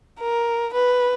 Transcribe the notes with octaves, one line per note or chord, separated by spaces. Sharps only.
A#4
B4